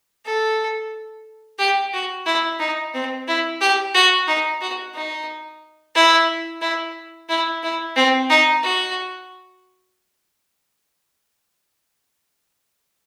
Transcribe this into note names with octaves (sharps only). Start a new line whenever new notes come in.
A4
G4
F#4
E4
D#4
C4
E4
G4
F#4
D#4
F#4
D#4
E4
E4
E4
E4
C4
D#4
F#4